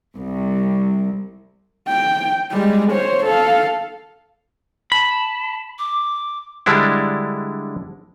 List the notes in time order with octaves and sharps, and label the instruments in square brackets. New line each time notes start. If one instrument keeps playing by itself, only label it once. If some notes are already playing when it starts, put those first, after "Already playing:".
[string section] C2
[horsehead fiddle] G5
G3 G#3
C5 C#5
A4 F5
[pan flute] A5 [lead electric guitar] B5
[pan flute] D6
[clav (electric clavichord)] D3 G3 G#3 D4 E4